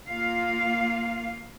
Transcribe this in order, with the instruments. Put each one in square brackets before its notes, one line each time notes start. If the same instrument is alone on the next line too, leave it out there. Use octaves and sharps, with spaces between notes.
[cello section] A#3 F4 F5